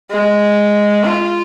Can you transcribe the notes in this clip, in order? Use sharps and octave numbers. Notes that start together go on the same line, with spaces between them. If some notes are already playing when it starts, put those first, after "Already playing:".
G#3
F4